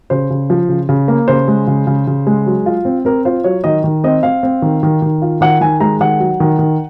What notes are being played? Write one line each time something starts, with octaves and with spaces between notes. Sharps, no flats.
C#3 C5
C#3
F3
C#3
C#3
A#3
C#3 C5
G#3
C#3
C#3
C#3
G#3
F#3
F4
C4
C4 A#4
F4 C5
F#3 C#5
D#3 D#5
D#3
C4 D#5
C4 F5
C4
D#3
D#3
D#3
F4
D#3 F#5
D#3 G#5
G#3 A#5
D#3 F#5
F#3
D#3
D#3